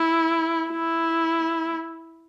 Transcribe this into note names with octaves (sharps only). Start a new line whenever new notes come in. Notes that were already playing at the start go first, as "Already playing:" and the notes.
Already playing: E4
E4